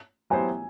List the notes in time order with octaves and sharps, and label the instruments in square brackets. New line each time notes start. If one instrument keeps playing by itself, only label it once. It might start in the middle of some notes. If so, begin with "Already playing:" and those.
[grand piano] F#3 B3 E4 G4 C5 [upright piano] G#5